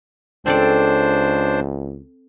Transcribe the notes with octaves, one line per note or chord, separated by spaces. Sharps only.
C#2 C4 D4 A4 C5 D5